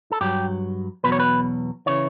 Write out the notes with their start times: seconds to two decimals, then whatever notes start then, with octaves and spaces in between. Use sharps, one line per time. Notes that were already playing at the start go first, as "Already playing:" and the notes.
0.12 A4
0.21 G2 F#3 G4
1.04 E2 B2 F#3 B4
1.12 C#5
1.20 B4
1.86 C#3 E3 C#5